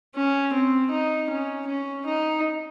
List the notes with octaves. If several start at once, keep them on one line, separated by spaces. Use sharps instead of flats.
C#4
C4
D#4
C#4
C#4
D#4